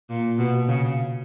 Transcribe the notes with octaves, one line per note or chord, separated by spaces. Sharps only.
A#2
B2
C#3